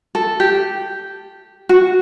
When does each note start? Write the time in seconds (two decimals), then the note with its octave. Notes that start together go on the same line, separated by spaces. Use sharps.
0.15 A4
0.40 G4
1.69 F#4